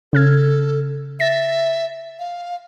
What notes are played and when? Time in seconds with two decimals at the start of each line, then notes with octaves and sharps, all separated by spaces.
0.13 C#3 A4 F6 G#6
1.20 E5 A6 A#6
2.19 F5